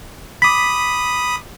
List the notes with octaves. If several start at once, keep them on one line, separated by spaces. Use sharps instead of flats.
B5 D6 D#6 B6